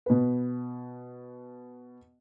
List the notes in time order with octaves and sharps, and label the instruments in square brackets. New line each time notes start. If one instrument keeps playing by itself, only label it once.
[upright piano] B2 B4